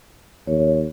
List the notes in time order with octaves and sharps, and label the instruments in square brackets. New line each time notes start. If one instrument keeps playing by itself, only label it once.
[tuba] D#2 [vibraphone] C#5